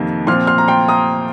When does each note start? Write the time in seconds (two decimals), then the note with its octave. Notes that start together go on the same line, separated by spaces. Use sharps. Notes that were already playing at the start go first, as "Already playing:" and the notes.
Already playing: F2 C3 D#3 A#3
0.27 A#2 F3 C4 C6 F6
0.47 C6 F6
0.58 A#5
0.68 G5 C6
0.88 A#5 D#6